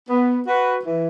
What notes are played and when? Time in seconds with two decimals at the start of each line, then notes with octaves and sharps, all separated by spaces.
0.09 B3
0.47 F#4 B4
0.84 E3